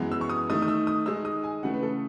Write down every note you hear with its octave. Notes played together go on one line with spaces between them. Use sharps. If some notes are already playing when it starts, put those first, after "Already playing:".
Already playing: F#2 E3 G#3 B3
E6
C#6
D#6
D#3 A3 D#4 D#6
D#6
E6
D#6
D#3 G#3 D#4 E6
D#6
G#5
C#3 E3 A3 C#4 F#5
B4
A4